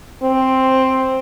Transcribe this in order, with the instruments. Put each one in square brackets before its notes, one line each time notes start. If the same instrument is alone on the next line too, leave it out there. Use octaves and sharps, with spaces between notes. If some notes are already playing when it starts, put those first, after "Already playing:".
[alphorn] C4